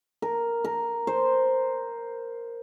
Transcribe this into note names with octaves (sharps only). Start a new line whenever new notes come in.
A#4
A#4
C5